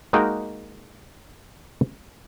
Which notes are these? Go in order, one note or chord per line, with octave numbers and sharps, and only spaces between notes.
G#3 A#3 D#4 F#4 A#4 G5